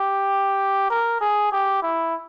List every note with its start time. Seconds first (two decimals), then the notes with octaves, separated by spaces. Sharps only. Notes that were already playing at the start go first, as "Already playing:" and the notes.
Already playing: G4
0.90 A#4
1.21 G#4
1.52 G4
1.82 E4